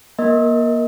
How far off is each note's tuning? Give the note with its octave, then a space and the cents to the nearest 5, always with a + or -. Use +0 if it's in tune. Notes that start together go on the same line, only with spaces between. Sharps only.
A#3 +30 A#4 +0 D#5 +25